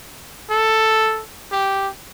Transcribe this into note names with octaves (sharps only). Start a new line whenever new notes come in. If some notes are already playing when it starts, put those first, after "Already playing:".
A4
G4